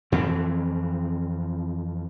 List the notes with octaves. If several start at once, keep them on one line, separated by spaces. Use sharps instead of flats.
F2 E3 C4